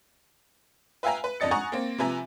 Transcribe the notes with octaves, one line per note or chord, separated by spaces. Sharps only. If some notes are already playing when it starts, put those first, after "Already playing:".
B4 E5 F5 G5 G#5 A#5
B4
F#1 F2 D4 D#5 A6 C#7
F#5 G#5 A#5 C#6 D#6
A#3 C4
C3 F3 B4 E5 G#5 A#5